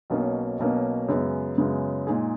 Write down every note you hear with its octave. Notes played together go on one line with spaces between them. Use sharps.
B1 B2 A#3 C#4
B1 B2 A#3 C#4
F#2 C#3 G#3 B3
F#2 C#3 G#3 B3
A#2 G#3 D#4 G#4